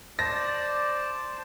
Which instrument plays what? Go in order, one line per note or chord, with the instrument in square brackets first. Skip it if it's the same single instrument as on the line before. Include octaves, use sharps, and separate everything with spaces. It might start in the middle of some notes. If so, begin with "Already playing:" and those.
[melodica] C5 A5 [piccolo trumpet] D5 [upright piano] A#6